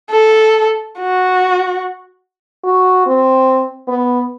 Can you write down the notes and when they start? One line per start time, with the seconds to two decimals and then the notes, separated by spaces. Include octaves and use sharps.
0.11 A4
1.00 F#4
2.64 F#4
3.06 C4
3.88 B3